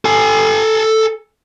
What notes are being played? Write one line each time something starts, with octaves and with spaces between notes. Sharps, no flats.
A4 G#5